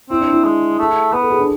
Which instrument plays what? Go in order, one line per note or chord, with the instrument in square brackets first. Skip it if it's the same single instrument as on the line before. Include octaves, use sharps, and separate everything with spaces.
[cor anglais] C4 [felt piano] E4
[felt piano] D4
E4
[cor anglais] G#3 [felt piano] G#4
[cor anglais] A3
[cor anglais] B3 [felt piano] B4
[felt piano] A4
G#4
D4